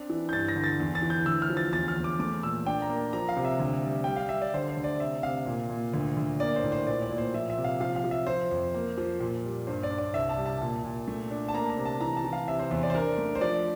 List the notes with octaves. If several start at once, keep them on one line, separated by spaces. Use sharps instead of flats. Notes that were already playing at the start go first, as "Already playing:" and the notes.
Already playing: C4 D4
E3
G6
G2 A6
A#6
D3
A6
E2
A6
E3
G6
D2 E6
F6
F3
A6
E2 A6
F6
E2
D6
A3 D6
A#2 E6
D4 G5
A#5
A#3
F3 A#5
F5
C3
E5
D2
G3
G3 G5
F5
G3 E5
D5
D3 C5
C5
D2
D5
C3 E5
C3 F5
A#2
A#2
D2
D2
A#3 D5
C5
A2
C5
A#2 D5
D5
A#2
C5
F3 E5
E5
C3
F5
F3 F5
F5
F3
E5
F3 C5
F2
A#3
F3
A#2
G3
G2 C5
D5
D4
D5
C2 E5
A5
G3
A5
A#2
A#2
A3
D4
A5
A#3 A#5
A#5
C3
A5
E3 A#5
A5
E3
F5
C3 E5
C5
E2 C5
D5
C5
D4 A#4
A3
C5
F3 D5